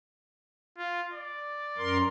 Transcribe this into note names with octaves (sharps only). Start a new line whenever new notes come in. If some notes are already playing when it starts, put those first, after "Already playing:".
F4
D5
F#2 A#4 C6